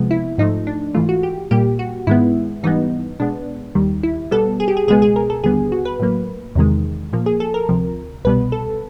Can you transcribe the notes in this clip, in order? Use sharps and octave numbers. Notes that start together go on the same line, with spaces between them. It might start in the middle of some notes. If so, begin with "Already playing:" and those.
Already playing: C#2 C3 F3 G#3 B3
E4
G#2 F3 A3 D#4
D4
G#2 E3 A3 F4
F#4
G4
A#2 G3 A#3 G4
F#4
G#2 D#3 G#3 B3 E4
G#2 E3 G3 B3 D#4
B2 G#3 B3 D4
D#2 D#3 G3
E4
B2 G3 B3 A4
G#4
G4
G#4
C#2 B2 G#3 B3 G#4
G#4
A#4
A4
D#2 D3 G3 B3 G#4
F#4
B4
A2 F#3 A#3
E2 C3 D#3 G#3
A#2 F3 A#3
G#4
A4
A#4
D2 C3 F3
C2 B2 G3 B3 B4
A4